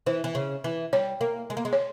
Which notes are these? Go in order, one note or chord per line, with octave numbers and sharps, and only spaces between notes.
E3 C5
E3
C#3
E3
G3 C#5
A#3
G#3
A#3
G#3
C#5